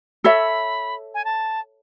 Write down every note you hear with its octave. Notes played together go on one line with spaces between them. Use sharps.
A4 C#5 E5 B5
G#5
A5